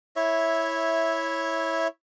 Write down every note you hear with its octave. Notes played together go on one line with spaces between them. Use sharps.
E4 C#5 E5